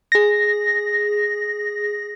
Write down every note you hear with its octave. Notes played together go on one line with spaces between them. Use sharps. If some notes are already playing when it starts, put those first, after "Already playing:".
G#4 A#6